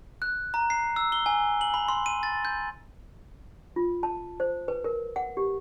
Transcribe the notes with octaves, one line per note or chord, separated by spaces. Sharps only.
F#6
A#5
C7
E6
G7
G#5
F#7
B5
C6
D#7
A6
G6
F4
A5
C5
B4
A#4
F#5
G4